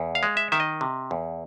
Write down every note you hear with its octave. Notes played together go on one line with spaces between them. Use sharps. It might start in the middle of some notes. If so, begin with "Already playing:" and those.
Already playing: E2
F5
G#3
E5
D#3 E5
D#5
C3
E2